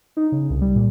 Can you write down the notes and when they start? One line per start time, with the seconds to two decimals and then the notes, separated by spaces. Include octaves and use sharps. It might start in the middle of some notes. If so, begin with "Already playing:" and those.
0.17 D#4
0.32 C#3
0.50 C2
0.61 G3
0.75 A#2